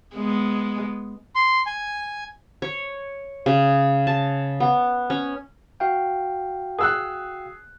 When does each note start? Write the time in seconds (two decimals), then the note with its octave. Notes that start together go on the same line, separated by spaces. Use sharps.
0.15 G#3 B3
1.35 C6
1.66 G#5
2.62 C#5
3.46 C#3
4.07 A5
4.60 B3
5.10 C#4
5.80 F#4 F5 G5
6.79 G#4 D#6 E6 F#6